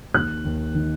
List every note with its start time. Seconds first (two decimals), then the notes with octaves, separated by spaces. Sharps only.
0.14 D#2 F#6
0.45 D#2
0.75 D#3